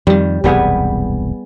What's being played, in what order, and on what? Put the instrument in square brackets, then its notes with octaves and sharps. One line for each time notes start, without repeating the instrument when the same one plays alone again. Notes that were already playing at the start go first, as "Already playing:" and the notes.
[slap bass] F2 D#3 [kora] G3
[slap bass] E1 C2 F#2 [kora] G3 B3 G#4